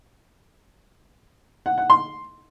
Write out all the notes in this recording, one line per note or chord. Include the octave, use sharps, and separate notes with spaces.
F#5
F#5
C6